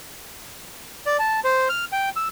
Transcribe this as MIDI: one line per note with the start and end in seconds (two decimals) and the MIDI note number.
1.06 1.17 74
1.19 1.40 81
1.44 1.68 72
1.69 1.85 89
1.92 2.09 79
2.16 2.28 88